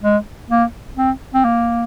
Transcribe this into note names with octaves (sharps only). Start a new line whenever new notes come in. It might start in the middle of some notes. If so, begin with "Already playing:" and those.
G#3
A#3
C4
C4
A#3